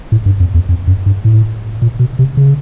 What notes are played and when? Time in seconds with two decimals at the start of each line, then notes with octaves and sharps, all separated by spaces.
0.12 A2
0.26 G2
0.40 F2
0.54 E2
0.69 F2
0.87 F#2
1.06 G2
1.25 A2
1.82 A#2
2.00 B2
2.19 C3
2.37 C#3